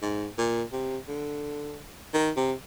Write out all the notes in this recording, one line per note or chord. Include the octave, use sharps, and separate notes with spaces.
G#2
A#2
C3
D3
D#3
C3